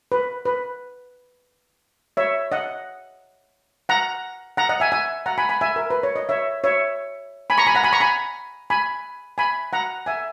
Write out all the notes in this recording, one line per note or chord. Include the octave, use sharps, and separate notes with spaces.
B4
B4
C#5 E5
D#5 F#5
F#5 A#5
F#5 A#5
D#5 F#5
E5 G#5
E5 G#5
F#5 A#5
G#5 B5
G#5 B5
E5 G#5
A#4
B4
C#5
D#5
C#5 E5
C#5 E5
G#5 B5
A#5 C#6
G#5 B5
F#5 A#5
G#5 B5
A#5 C#6
G#5 B5
G#5 B5
G#5 B5
F#5 A#5
E5 G#5